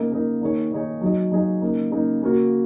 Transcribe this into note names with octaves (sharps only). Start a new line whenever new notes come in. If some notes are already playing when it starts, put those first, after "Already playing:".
Already playing: C#3 A#3 D#4 A#4 D#5
C#3 A#3 D#4 A#4 D#5
D#3 A#3 D#4 G#4 C#5
D#3 A#3 D#4 G#4 C#5
F#3 D#4 G#4 D#5
F#3 D#4 G#4 D#5
C#3 A#3 D#4
C#3 A#3 D#4
C#3 A#3 F#4